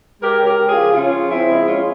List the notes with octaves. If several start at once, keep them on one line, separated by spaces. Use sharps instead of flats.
G#3 G4 A#4
C#3
G4 A#4
C#3
F4 G#4
F3
C#3 C#4 F4
C#3
F3 C4 E4
G#3
G#3 C#4 F4